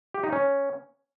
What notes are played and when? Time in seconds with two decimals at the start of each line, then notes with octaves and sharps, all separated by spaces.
0.14 G4
0.23 D#4
0.32 C#4